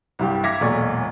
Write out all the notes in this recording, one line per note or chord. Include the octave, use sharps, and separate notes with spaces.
C2 G2 G4
E5 F5 D6 G#6 A#6 B6
E1 B1 A#2 G#3 D5 C#6